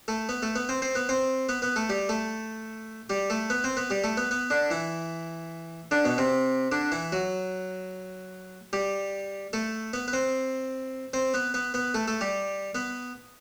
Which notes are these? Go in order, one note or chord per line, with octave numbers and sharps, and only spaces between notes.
A3 A4
B3 B4
A3 A4
B3 B4
C4 C5
C4 C5
B3 B4
C4 C5
B3 B4
B3 B4
A3 A4
G3 G4
A3 A4
G3 G4
A3 A4
B3 B4
C4 C5
B3 B4
G3 G4
A3 A4
B3 B4
B3 B4
D3 D4
E3 E4
D3 D4
B2 B3
C3 C4
D3 D4
E3 E4
F#3 F#4
G3 G4
A3 A4
B3 B4
B4
C4 C5
C4 C5
B3 B4
B3 B4
B3 B4
A3 A4
A3 A4
G3 G4
B3 B4